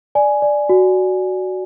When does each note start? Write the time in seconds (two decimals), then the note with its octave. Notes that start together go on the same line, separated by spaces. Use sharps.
0.15 D5 G#5
0.42 D5
0.69 F#4